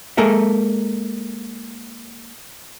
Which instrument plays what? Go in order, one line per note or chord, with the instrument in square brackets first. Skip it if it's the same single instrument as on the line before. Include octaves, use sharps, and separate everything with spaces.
[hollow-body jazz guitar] G#3 A#3 A4 A#4 E5